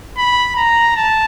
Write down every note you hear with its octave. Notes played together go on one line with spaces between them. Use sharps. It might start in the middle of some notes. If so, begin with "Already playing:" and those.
B5
A#5
A5